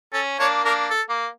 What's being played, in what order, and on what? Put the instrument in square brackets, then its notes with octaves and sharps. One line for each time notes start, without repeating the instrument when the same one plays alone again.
[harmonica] C#4 [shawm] A4
[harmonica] A#3 D4 [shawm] C#5
[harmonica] A#3 D4 [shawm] A#4
[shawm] A4
[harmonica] A#3